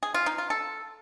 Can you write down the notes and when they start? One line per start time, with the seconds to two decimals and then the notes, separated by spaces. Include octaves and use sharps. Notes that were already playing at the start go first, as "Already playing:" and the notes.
0.03 G#4
0.14 F4
0.26 D#4
0.38 F4
0.50 A4